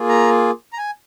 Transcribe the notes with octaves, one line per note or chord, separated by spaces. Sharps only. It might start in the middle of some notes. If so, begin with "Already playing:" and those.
Already playing: A#3 F4 G#4
A#5
A#5
G#5